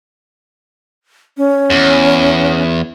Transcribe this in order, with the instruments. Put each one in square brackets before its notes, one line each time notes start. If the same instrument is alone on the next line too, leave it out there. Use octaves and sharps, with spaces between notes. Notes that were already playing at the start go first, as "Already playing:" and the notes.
[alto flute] C#4
[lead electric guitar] E2